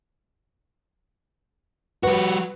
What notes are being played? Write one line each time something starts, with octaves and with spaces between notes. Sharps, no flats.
G3 F#4 B4